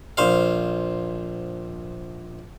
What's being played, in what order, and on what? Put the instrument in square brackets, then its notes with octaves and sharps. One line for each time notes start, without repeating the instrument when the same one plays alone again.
[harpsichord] A#1 C5 F5